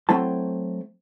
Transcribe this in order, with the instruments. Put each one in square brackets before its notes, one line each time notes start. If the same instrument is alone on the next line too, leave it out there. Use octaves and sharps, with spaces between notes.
[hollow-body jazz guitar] F#3 A3 C4 E4 A5